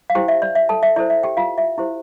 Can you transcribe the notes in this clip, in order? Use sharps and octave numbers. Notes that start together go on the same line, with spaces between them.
F5
E4 G4 C5 G5
E5
D5
E5
A4 A5
E5
E4 A4 C5 D5
E5
G4 G5
F4 F5
E5
E4 G4 C5